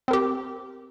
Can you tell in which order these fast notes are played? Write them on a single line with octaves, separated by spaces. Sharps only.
C4 A#4 G4